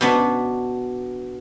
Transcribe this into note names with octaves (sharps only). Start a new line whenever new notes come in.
B2 B3 D4